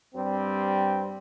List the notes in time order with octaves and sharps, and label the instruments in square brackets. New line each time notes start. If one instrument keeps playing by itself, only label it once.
[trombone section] G2 G3 C4